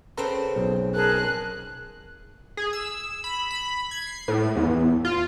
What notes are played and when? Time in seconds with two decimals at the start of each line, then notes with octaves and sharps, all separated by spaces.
0.17 C#3 C4 A4 B4 C5 A#5
0.56 B1
0.95 G#4 A#4 A5 F#6
2.57 G#4
2.73 E6
3.24 B5
3.51 B5
3.91 G#6
4.07 C7
4.28 A2
4.56 E2
5.05 F4